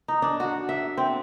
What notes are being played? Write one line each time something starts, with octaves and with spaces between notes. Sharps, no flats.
D#4
D4
F#4
E5
C4